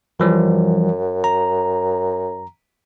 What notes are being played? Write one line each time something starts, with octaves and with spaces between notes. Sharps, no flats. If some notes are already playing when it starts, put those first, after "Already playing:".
F#2 E3 F3 G3
A#5